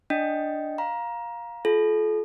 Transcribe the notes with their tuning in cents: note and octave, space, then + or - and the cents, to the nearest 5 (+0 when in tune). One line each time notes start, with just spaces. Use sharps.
D4 +0 D#5 +0 G5 -15
F5 +10 A#5 +20
F4 +0 A4 -40